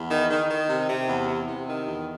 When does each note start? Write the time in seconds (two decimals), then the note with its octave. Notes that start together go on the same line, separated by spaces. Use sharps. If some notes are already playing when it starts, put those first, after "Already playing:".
Already playing: E2
0.10 D#3
0.29 D#3
0.49 D#3
0.69 C3
0.89 C3
1.08 E2
1.28 C3
1.48 C3
1.67 D#3
1.86 E2